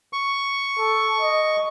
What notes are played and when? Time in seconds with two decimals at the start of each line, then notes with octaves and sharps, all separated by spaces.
0.13 C#6
0.78 A4
1.21 D#5